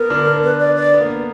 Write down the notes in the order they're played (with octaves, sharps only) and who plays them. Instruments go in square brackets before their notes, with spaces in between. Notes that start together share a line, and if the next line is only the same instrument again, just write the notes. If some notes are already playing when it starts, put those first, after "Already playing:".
Already playing: [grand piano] B3 [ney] A#4
[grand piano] D3 D4
B3
[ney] B4
D5
D5
[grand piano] B3
A#3
B3